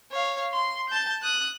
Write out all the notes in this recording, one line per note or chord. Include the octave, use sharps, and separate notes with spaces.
C#5 F5
C6
A5 G6
D#6 F#6